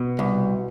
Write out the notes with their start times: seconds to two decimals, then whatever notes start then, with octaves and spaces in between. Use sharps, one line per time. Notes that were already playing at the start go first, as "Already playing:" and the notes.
Already playing: B2
0.19 C2